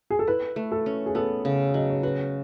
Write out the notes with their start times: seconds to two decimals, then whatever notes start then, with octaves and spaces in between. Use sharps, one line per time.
0.10 G#4
0.19 A4
0.27 E4 B4
0.56 A3
0.72 A4
0.86 C#4
1.06 G#4
1.15 B3 A4
1.45 C#3
1.74 F#3 D#5
1.90 C#5
2.03 F#4 B4